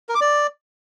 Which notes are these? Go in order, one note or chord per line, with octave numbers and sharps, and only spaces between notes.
A#4
D6
D5